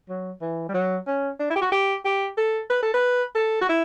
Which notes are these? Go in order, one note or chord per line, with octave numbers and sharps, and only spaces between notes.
F#3
E3
G3
F#3
C#4
D4
E4
G4
F#4
G4
G4
A4
B4
A4
B4
A4
F#4
E4